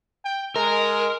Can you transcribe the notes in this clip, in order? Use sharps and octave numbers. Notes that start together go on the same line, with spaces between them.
G5
G#3 A#4